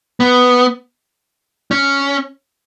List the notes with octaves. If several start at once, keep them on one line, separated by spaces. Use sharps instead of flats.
B3
C#4